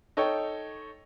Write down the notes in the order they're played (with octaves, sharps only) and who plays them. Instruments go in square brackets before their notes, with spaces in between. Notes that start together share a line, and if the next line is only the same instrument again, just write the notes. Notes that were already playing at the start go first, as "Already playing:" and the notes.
[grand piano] D#4 A4 C#5 G5